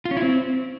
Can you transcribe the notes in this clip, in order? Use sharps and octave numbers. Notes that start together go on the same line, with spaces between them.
F4
C#4
E4
C4